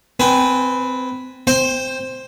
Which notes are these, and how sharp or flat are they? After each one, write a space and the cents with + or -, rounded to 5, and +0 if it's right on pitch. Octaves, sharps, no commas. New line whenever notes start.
C4 -20 B4 +0 G#5 +0
C5 +0 G5 +20 C6 +0